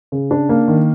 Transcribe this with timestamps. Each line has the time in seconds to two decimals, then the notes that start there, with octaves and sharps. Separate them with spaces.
0.12 C#3
0.31 D4
0.49 A#3
0.68 D#3